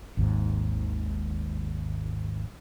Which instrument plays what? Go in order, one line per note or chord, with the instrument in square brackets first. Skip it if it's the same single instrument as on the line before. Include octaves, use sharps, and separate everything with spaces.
[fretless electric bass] G#1 D#2 G#2